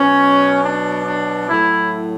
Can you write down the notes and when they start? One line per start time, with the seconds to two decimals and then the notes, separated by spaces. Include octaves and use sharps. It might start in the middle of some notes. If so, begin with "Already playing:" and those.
Already playing: B2 F#3 C#4
0.64 D4
1.06 D4
1.48 A2 F#3 E4